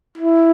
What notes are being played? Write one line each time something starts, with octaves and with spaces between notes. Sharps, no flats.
E4